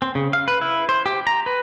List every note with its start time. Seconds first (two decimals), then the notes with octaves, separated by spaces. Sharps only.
0.02 C4
0.15 C#3
0.33 F5
0.48 B4
0.61 E4
0.89 C5
1.06 G4
1.27 A#5
1.46 B4